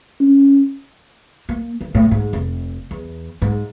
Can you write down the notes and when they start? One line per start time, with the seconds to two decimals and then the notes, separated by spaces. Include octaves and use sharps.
0.20 C#4
1.49 A#3
1.81 D#3
1.95 A2
2.11 G#2
2.33 F1
2.91 E2
3.42 G#2